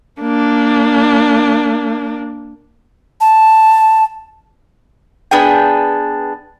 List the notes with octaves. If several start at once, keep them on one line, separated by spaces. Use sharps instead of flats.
A#3 D4
A5
B3 D4 G#4 G5